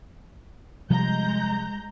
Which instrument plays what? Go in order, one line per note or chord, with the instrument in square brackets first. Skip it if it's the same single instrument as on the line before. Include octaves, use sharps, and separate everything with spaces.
[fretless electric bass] C3 F3 G3 [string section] G#3 A#5 G6